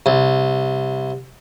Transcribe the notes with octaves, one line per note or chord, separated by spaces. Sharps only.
C2